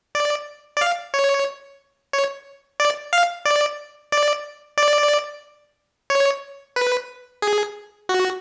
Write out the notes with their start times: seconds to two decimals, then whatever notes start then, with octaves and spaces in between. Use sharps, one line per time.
0.15 D5
0.77 D5
0.81 F5
1.14 C#5
2.13 C#5
2.80 D5
3.13 F5
3.45 D5
4.12 D5
4.78 D5
6.10 C#5
6.76 B4
7.42 G#4
8.09 F#4